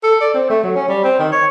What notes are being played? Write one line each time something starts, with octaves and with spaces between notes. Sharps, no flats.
A4
D5
C4
A3
F#3
C#4
G3
C4
D#3
C#5